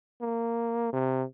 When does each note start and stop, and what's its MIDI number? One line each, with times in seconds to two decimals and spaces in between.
0.22 0.91 58
0.93 1.24 48